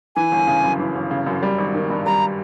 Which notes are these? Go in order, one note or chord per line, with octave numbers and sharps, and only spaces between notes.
E3 G#5
G1
C#3
F#2
E3
G1
C#3
F#2
G3
G#1
D#3
G2
G3 A#5